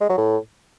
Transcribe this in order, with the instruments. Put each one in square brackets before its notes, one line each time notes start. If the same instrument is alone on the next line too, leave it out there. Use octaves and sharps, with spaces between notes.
[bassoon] G#3
F#3
A2